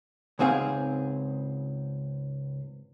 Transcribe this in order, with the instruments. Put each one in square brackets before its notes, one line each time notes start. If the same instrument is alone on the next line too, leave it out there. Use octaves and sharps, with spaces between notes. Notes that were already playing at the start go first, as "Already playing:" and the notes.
[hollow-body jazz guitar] C#2 G#2 C4 G#4 F5